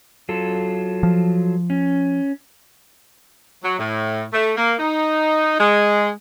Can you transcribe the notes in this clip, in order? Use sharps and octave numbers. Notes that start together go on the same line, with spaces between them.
F#3 F4 A4
F3
C#4
F#3
A2
A3
A#3
D#4
G#3